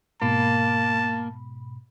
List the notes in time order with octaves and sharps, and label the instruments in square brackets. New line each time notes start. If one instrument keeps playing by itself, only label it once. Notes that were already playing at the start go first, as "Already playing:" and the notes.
[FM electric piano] G#2 B2 B5 [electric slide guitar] A#3 [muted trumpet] A5